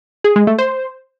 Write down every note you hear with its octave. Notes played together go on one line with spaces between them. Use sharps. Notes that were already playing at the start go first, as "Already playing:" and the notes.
G#4
G#3
A3
C5